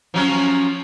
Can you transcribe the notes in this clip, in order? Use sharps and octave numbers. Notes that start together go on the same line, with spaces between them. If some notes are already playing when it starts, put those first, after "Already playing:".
F3 F#3 C#4